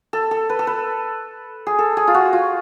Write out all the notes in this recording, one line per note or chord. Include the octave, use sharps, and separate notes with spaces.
A4
A4
B4
A4
B4
G#4
A4
G#4
F4
F#4
F4